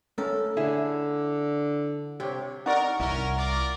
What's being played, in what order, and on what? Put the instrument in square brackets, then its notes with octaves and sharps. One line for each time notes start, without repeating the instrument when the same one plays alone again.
[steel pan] A3 C#4 A#4 [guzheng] A4
[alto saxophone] D3 [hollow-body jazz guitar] E4 G#4 E5
[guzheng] C3 [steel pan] G4 C#5
[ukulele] D#4 D5 [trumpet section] A#4 [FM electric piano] F#5 C#6
[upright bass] C2 [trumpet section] C#4 A#4 [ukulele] E4
[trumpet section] F4 A#4 D5